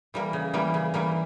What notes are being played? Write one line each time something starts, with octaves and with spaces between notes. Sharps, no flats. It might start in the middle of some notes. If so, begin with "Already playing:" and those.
E3 G3 A#3
C#3
E3 G3 A#3
C#3
E3 G3 A#3